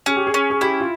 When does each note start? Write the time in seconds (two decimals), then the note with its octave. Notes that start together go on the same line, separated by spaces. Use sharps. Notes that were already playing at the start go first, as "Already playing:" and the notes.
0.06 C#4 G#4
0.16 G4
0.27 G#4
0.34 C#4
0.50 G#4
0.61 E4 G4
0.81 F4